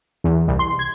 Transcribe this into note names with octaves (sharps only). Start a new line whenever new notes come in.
E2
C2
C6
G#6